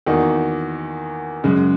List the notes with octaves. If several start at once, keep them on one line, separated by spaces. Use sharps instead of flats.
E2 D#3 A#3 D#4 F#4
F#2 C#3 G#3